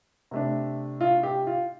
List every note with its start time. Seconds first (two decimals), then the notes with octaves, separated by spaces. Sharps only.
0.31 C3 A3 D4
1.01 F4
1.23 G4
1.47 F4